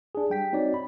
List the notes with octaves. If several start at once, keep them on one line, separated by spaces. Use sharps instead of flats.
D4 G#4
G3 G5 B6
C4 D#4 F#4 C#5 D5
B5